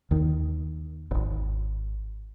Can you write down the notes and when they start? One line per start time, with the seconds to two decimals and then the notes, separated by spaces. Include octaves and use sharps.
0.11 D#2 D#3
1.11 D#1 G#1